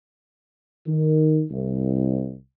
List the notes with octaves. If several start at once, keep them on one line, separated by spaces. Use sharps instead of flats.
D#3
C2